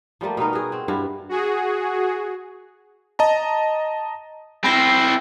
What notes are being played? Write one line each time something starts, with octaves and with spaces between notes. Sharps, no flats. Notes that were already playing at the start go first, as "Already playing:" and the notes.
F3 G3 A3 A#3
B2 B3 D#4 A#4
F#4 G#4
C4
G2 E4 F#4 F5
F#4 G#4
D#5 A5 A#5
C4 E4 B5 A#6